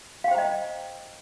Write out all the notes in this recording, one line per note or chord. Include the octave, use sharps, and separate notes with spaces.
C5 D#5 F5 G5 A#5